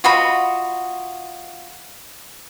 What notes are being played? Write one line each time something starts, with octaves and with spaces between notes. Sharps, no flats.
F4 F#4 D#5 B5